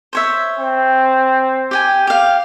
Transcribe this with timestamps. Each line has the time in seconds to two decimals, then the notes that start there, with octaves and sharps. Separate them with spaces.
0.13 C5 C#5 E5
0.59 C4
1.71 G4 G5 G#5
2.07 G4 F5